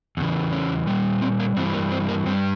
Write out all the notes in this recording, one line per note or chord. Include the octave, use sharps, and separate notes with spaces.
E2 C#3 E3
C#4
A#2 G3
C4
A#3
G2 E3 G3 C4
A#3
C4
A#3
G2 G3 C4